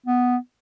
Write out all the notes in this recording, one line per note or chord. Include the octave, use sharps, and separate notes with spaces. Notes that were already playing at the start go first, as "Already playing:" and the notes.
B3